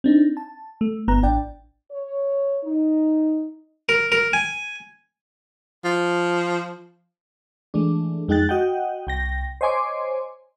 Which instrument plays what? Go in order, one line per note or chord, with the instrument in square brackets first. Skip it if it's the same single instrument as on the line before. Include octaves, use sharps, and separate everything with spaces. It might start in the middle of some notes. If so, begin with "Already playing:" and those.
[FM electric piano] C4 D4 D#4
A5
A3
G1 B3 A#5 F#6
A1 D4 D5 G5
[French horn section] C#5
D#4
[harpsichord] A#4
A#4
G#5
[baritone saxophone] F3
[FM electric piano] E3 G#3 A3 D4
F2 G#3 D#4 G5 F#6 A6
F#4 D#5 F#5 G5
C2 G5 A#6
C5 C#5 D#5 G#5 C6 D6